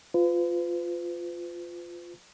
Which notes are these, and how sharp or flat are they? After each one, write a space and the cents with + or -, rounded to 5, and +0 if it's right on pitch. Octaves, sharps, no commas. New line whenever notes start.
F4 +0 B4 +45